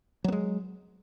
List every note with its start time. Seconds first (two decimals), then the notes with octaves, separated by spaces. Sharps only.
0.24 F#3
0.28 B3
0.32 G#3